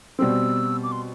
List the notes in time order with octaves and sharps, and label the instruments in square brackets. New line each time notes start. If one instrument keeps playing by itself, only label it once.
[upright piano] B2 G3 C4 [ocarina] E6
[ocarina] D6
C6